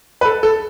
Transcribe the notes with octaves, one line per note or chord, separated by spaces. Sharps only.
B4
A4
A4